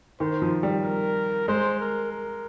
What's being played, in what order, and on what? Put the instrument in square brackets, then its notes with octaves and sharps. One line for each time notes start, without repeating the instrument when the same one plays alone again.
[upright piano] D#3 [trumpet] C5
[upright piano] F3
G3
[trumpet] A#4
[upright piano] G#3 [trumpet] C5
[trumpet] A#4
A#4